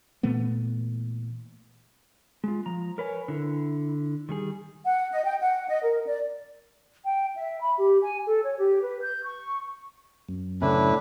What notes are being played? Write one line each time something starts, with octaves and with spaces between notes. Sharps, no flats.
A#2 E3 A3 B3
G#3 F4
F3 A#5
A#4 B4 C#5 G#5
D3 E4
D#3 G3 G#4
F#5
D#5
G5
F#5
D#5
A#4
D5
G5
E5
B5
G4
G#5
A4
C#5
G4
B4
G6
C#6
F#2
A2 C#3 C#4 D4 E4 B4